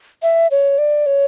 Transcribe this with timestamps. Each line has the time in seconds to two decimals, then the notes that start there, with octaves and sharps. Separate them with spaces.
0.23 E5
0.51 C#5
0.78 D5
1.06 C#5